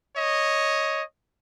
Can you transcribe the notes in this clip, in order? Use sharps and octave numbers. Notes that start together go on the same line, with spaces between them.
C#5 D#5